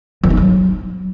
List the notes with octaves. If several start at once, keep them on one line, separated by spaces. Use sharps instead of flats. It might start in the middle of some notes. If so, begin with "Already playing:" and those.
F3
D#4
F#3